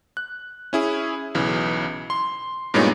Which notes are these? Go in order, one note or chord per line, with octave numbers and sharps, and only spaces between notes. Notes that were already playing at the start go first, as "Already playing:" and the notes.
F#6
C#4 E4 G#4
B1 C#3 E3
C6
G2 A#2 G#3 B3 D#4 C#5